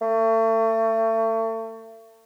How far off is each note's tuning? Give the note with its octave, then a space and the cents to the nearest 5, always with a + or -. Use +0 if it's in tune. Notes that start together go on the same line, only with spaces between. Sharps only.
A3 +35